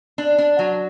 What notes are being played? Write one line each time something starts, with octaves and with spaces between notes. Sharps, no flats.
D4
D4
F#3